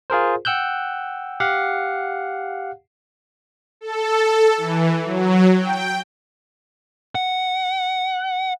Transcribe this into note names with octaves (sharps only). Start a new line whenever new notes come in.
F4 G#4 A#4 C5
F#5 G5 E6 F#6 G6
G4 F5 F#5
A4
E3
F#3
G5
F#5